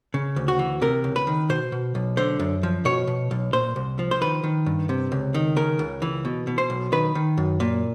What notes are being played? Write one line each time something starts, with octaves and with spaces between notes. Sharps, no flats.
C#3
D2
F#4
E3
C3 A#4
C#2
B4
D#3
B2 C5
B2
B1
D3 C5
F#2
F3
B2 C#5
B2
B1
A#2 C5
C2
F3
C5
D#3 B4
D#3
G2
C3
C#2
D#3
C#3 A#4
C#2
E3
B2
B2
C5
B1
D#3 B4
D#3
F#2
A#2